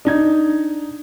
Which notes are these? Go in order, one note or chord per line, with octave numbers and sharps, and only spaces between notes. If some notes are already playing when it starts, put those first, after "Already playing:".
D4 D#4 G#6